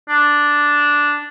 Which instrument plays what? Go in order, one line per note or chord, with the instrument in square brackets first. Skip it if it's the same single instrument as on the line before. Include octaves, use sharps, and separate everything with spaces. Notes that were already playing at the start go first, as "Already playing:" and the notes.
[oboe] D4